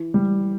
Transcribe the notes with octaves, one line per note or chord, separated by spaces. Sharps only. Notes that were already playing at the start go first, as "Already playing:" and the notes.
Already playing: E3
G3